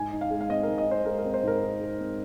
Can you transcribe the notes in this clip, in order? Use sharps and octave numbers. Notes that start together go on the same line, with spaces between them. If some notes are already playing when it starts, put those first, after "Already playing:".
Already playing: G#2 G#5
D#4
F5
G#3
F5
C4 D#5
G#2 A#4
D#5
D#4 C5
G#3 A#4
A#4
C4
C5
G#2 A#4
D#4
G#3
C4